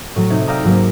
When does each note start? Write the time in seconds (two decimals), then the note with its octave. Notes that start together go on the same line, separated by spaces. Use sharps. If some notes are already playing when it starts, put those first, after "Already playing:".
0.16 A2 F#3
0.30 C3 D#4 G#6
0.47 D5 F5 G5 A#5 D#6 E6
0.64 G#2 F#3 A#3